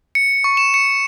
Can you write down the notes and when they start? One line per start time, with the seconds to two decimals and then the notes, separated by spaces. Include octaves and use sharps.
0.15 C#7
0.44 C#6
0.57 E7
0.74 C#7